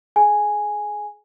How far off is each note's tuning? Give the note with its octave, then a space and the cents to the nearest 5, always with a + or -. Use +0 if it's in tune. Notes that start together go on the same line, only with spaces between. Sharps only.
G#4 +25 G#5 +0